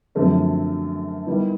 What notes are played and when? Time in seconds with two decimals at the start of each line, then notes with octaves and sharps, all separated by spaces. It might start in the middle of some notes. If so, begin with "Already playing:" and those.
0.15 F#2 D3 F3 A3 C4
1.27 D#3 G3 B3 E4